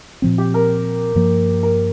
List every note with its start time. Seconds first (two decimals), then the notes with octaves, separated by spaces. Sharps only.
0.22 A#2 F3 C4
0.38 G4
0.54 A#4
1.15 G2 F3 A#3
1.63 A#4